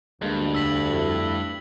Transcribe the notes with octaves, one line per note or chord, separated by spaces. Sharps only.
D2 G2 G#3 A#3 D4
A1 E2 D4 E6 B6 F#7
F2 A3 E4